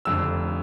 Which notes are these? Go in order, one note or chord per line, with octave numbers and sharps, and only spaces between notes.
F1 F2 D3 E6